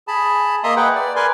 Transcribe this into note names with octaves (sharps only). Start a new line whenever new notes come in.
G#4 A5 B5
A#3 D#5 E5 A#5 C6 D#6
G#4 B4 F#5 G5
D5
A#4 B4 G#5 C6